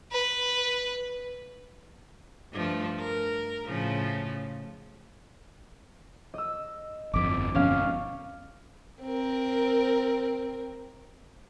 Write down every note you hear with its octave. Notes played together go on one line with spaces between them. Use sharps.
B4
G2 F3 A3
A#4
A2 C#3 F3
D#5 E6
G1 F2 D6 B6
G1 F2 B2 C#4 F5
C4 A#4